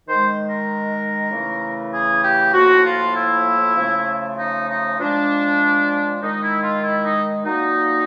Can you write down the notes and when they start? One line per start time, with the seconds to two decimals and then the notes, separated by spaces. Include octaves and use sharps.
0.09 D#3 G#3 C5
0.50 A#4
1.32 C#3 E3 A3
1.93 G#4
2.24 G4
2.54 A2 F3 A#3 F#4
2.85 F4
3.16 E4
3.76 C#3 F3 A3
4.38 D#4
4.69 D#4
4.99 A#2 F3 G#3 D4
6.22 D#3 G#3 D#4
6.43 E4
6.63 F4
6.84 E4
7.04 D#4
7.45 A#2 F#3 A#3 D#4